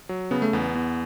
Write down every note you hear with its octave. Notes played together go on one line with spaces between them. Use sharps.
F#3
C#3 B3
A3
E2 B3
E2